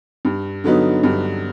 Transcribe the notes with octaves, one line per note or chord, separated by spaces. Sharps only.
G2
D3 F#3 B3 D#4
G2